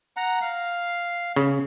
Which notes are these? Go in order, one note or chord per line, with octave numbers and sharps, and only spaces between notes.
F#5 A#5
F5
C#3